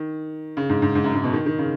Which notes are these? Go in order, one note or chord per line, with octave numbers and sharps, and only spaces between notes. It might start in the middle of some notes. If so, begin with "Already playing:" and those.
Already playing: D#3
C#3
G#2
G#2
G#2
F#2
G#2
B2
D#3
D#3
C#3